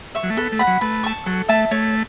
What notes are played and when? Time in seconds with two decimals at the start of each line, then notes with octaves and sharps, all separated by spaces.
0.15 E5 C#6
0.23 F#3
0.30 A3
0.37 B3 A4
0.52 A3
0.59 F#5 B5
0.67 F#3
0.81 A3 B4
1.04 A5 C#6
1.26 F#3 A4
1.48 A3 E5 A5
1.71 A3 C#5